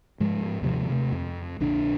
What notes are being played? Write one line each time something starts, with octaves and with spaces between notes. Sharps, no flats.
G#2 F3 G#3
D#2 C3 F3
C3 A3
F2
A#1 D3 D4